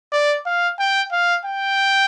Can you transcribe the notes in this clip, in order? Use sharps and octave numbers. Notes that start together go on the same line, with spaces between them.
D5
F5
G5
F5
G5